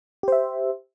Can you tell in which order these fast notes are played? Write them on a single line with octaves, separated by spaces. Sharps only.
G4 C5 E5